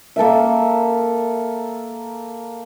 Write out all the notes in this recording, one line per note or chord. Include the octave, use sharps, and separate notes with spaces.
A#3 A4 A#4 E5